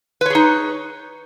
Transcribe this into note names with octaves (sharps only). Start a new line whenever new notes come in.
D#4 G#4 B4 C#5